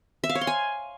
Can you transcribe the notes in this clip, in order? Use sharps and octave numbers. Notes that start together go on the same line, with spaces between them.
E5
F5
C#5
C6
G#5